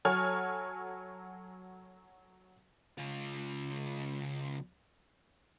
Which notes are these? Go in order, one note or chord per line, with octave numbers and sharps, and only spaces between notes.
F#3 A4 C#5 G#5 F6
C#2 F4